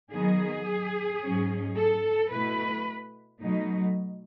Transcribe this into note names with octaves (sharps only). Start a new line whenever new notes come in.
D#3 F#3 B3 G#4
G#2 F#3 C#4
A4
B2 A3 E4 B4
B2 F#3 A3 D#4